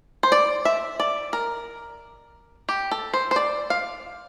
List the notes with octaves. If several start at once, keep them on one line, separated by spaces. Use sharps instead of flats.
C5
D5
E5
D5
A#4
G4
A4
C5
C5
D5
F5